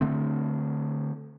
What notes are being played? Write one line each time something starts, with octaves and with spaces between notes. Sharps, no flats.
D3 A3 C4